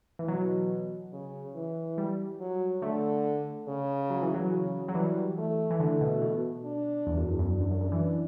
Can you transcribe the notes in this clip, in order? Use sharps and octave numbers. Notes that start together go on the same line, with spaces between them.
E3
B2 F#3
C#3
E3
G3
F#3
D3 A3
C#3
F#3
E3
F#3
C#3
F#3
E3 G3
A3
E3
D3 A3
B2
B2
D4
E2
F#2
E2
F#2
D4
F#2
F#2
F#2
E3